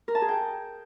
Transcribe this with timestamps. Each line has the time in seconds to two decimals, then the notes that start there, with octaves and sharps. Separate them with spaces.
0.08 A#4
0.15 A5
0.22 G#4
0.29 G5